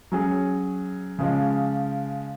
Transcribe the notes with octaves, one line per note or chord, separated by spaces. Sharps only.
F#3 C#4 G#4
C#3 F3 G#3